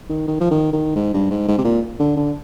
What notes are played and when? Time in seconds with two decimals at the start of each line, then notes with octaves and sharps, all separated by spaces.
0.10 D#3
0.28 D#3
0.41 F3
0.51 D#3
0.73 D#3
0.96 G#2
1.14 G2
1.31 G#2
1.48 G#2
1.58 C3
1.65 A#2
1.99 D3
2.16 D3